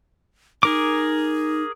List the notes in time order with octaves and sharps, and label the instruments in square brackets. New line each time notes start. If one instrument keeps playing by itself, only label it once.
[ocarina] D#4 [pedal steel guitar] G#4 A#4 D6